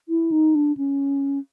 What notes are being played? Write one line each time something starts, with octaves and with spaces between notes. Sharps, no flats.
E4
D#4
D4
C#4